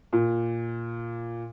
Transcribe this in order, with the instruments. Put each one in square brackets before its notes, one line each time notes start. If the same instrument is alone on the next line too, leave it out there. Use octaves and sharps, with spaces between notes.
[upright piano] A#2